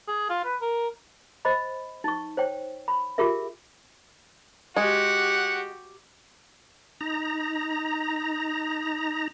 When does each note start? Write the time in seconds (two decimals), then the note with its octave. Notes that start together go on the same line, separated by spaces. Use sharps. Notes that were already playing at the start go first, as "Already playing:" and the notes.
0.08 G#4
0.30 F4
0.45 B4
0.62 A#4
1.45 C5 D#5 B5
2.04 D#4 C#6
2.37 C5 C#5 G5
2.88 B5
3.18 F4 G4 G#4 A#4 E5
4.77 G#3 F#4 G4 F#5
7.01 D#4 A#5